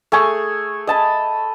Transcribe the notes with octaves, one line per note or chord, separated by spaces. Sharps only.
A3 G#4 G#5 C#6
D#5 A5 B5